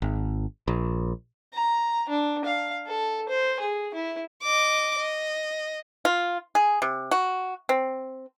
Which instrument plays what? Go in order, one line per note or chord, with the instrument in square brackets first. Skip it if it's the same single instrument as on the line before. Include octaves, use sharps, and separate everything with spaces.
[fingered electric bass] G#1
A#1
[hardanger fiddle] A#5
D4
F5
A4
C5
G#4
E4
[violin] D#5 D6
D#5
[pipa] F4
G#4
C3
F#4
C4